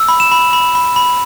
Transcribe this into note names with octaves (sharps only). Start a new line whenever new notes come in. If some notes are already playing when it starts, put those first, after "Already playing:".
Already playing: E6
B5
E7
B5
B5
B5
B5